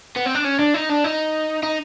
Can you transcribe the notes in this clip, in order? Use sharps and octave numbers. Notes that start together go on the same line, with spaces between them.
B3
C4
D4
C#4
D4
D#4
D4
D#4
D#4